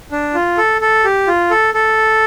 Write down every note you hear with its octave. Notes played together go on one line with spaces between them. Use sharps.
D4
F4
A4
A4
G4
F4
A4
A4